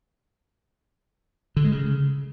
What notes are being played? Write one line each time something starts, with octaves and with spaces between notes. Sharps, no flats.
D3
G#3
C#3